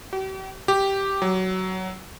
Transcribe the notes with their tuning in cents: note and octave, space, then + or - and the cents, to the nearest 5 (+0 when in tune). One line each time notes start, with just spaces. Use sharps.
G4 -45
G4 -5
F#3 +15